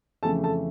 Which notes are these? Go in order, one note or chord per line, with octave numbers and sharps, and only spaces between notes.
F2 C#3 E3 A3 A4 A5
A4 A5